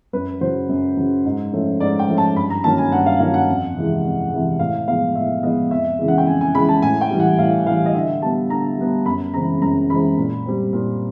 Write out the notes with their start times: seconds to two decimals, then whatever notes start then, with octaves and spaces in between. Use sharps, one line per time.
0.13 F#2 B4
0.41 C#3 F#3 C5
0.69 F#2
0.97 C#3 F#3
1.25 G#2
1.53 F3 A3 C#4
1.80 G#2 D5
1.99 G5
2.08 F3 A3 C#4
2.18 A5
2.36 G2 B5
2.50 A#5
2.64 D#3 F#3 A#3 C#4 A5
2.78 G#5
2.92 G2 F#5
3.06 F5
3.20 D#3 F#3 A#3 C#4 F5
3.34 F#5
3.48 F2
3.76 C3 E3 G#3
4.04 F2
4.32 C3 E3 G#3
4.59 A2 F5
4.88 F3 G#3 B3 F5
5.15 A2 E5
5.43 F3 G#3 B3 D#5
5.71 F2 E5
5.99 C#3 E3 G#3
6.08 F#5
6.18 G5
6.27 F2 G#5
6.41 G#5
6.55 C#3 E3 G#3 B5
6.69 A5
6.82 A2 G#5
7.01 G5
7.11 E3 G3
7.20 F#5
7.39 A2 F5
7.66 E3 G3 F5
7.86 D#5
7.94 D3 E5
8.22 G3 B3 A5
8.50 D3 A#5
8.78 G3 B3
9.06 F#2 B5
9.34 C#3 E3 G#3 C4 A#5
9.61 F#2 A#5
9.90 C#3 E3 G#3 C4 B5
10.18 A#2
10.45 G3 C4
10.73 A#2